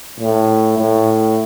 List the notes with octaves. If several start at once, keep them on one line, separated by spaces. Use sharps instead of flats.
A2
A2